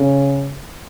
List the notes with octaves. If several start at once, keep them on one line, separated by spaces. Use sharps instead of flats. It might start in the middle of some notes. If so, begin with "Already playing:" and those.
Already playing: C#3